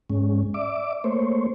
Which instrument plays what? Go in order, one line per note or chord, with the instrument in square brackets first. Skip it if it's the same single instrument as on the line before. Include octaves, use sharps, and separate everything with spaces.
[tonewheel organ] G#2 G#3 C#4
D5 E5 D6
A3 A#3 C5 C#5